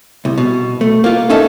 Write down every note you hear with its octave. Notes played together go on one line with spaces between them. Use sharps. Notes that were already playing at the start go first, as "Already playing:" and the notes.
C2
B2
A3
A#3 F4
C#4 D#4 A4 E5 A5